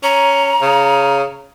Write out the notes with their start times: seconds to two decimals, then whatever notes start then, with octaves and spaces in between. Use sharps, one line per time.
0.03 C#4 A#5
0.61 C#3